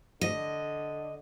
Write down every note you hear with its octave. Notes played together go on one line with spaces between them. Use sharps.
D3 D#5